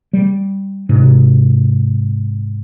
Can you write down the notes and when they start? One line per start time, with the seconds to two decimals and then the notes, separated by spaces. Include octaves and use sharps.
0.13 G3
0.89 G#2 C3